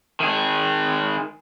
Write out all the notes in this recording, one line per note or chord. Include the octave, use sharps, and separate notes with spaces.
D#3 G#4